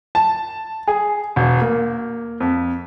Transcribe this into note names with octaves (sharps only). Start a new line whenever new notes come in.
A5
G#4
E1
A#3
F2